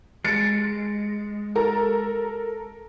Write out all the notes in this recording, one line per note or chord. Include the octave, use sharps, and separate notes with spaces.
G#3 A6 C#7 D7
A4 A#4 A#5